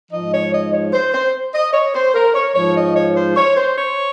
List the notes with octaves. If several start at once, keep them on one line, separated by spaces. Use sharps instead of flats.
G#2 F3 D#5
C#5
D#5
C#5
C5
C5
D#5
C#5
C5
A#4
C#5
G#2 F3 C#5
D#5
C#5
C5
C#5
C5
C#5